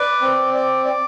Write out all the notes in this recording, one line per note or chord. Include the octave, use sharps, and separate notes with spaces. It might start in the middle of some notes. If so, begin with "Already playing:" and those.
Already playing: B4 D5
C4
D5
D5